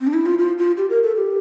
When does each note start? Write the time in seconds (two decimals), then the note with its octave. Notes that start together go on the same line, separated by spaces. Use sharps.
0.01 C4
0.07 D4
0.14 E4
0.26 F4
0.39 F4
0.58 F4
0.77 G4
0.90 A#4
1.03 A4
1.16 G4